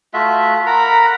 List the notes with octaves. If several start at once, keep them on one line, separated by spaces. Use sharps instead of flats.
A3 F4 F#4 E5
A#4 F#5 A#5 B5